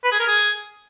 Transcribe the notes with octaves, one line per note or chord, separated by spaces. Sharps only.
B4
G#4
A#4
G#4